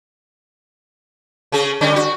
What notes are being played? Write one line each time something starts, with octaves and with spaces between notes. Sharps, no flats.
C#3 C#4 G#4
D3 G3 C#4
F#4